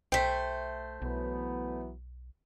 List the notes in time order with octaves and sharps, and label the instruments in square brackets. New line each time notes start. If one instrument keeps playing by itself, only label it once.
[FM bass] B1 [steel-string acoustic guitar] A3 C5 [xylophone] G5 B6
[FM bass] B1 [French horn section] E3 F#3 B3